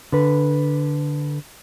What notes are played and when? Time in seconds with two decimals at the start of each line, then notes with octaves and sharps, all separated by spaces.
0.12 D3 B4